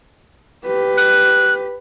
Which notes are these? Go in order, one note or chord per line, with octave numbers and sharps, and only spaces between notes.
G4 B4
F#6